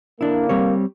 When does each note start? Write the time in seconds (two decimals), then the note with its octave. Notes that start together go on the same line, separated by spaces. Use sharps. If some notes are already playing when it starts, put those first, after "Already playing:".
0.21 D3 A#3 D4 E4
0.49 G3 C4 C#5